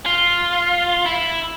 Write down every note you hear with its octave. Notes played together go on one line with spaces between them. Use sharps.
F4
E4